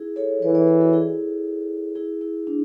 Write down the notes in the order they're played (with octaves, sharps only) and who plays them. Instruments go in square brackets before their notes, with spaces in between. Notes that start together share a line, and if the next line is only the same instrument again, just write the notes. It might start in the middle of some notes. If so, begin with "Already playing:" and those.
Already playing: [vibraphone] E4 G#4
A4 C#5
[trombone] E3 [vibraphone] B4 D5
[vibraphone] B4 D5
A4 C#5
F#4 A4
E4 G#4
E4 G#4
E4
D4